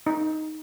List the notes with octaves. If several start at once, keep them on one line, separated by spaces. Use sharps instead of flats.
D#4